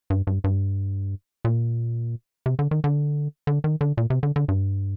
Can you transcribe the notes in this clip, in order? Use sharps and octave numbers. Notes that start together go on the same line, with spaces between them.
G2
G2
G2
A#2
C3
D3
D#3
D3
D3
D#3
D3
A#2
C3
D3
D3
G2